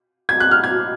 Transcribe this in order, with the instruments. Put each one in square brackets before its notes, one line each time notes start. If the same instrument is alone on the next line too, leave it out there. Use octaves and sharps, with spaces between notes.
[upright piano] G#6
F#6
F6
G#6